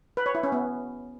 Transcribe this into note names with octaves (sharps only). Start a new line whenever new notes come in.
B4
C#5
E4
C#4
B3